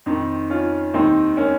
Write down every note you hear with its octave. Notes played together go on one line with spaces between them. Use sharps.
F2 D#3 C4 D#4
C#4 F4
D#2 D#3 C4 D#4
A#3 C#4